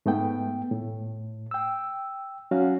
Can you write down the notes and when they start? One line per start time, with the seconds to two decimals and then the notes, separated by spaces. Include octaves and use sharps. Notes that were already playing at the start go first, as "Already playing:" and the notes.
0.06 G#2 A3 B3 G5
0.71 A2
1.51 G5 E6
2.51 F#3 C#4 F#4 F5